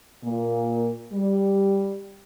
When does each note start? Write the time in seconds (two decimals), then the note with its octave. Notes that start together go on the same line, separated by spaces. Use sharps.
0.24 A#2
1.13 G3